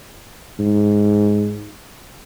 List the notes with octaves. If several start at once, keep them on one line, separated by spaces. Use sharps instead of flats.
G#2